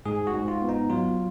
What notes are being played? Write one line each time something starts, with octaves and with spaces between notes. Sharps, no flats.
G#2 G#4
F#4
G#2
F4
B3
D#4
F#3 F4